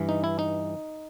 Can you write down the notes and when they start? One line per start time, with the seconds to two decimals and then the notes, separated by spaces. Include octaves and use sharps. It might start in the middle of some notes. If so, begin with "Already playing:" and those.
Already playing: G2 E3
0.09 D#4
0.24 E4
0.39 D#4